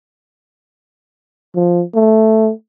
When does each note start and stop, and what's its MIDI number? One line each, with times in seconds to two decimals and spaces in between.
1.55 1.83 53
1.95 2.51 57